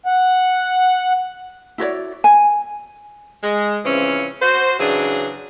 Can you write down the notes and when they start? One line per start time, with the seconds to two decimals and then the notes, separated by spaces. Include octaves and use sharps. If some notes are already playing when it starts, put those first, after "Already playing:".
0.06 F#5
1.78 E4 F#4 C#5 D5
2.24 G#5
3.43 G#3
3.85 C#3 E3 F3 C4 C#4
4.41 F#4 C5
4.79 C#3 E3 F#3 D4 G#4